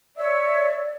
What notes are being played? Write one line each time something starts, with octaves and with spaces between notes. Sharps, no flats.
C#5 D5 E5 E6